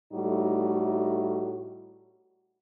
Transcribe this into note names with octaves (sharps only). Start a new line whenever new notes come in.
A2 G3 A3 D#4 F#4